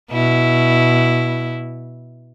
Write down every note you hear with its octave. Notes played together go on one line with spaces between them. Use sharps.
B2 E4